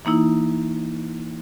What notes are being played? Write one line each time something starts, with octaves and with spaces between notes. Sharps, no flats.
E3 A#3 D#4 E4